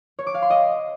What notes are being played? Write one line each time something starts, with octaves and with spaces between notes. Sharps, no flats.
C#5
D6
F5
C6
D#5